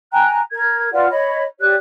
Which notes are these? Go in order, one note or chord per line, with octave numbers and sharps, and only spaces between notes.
G5 G#5 A#5 F#6
A#4 G#6
F4 B4 D5 F#5
C#5 D#5 B5
G4 C#5 D5 F#6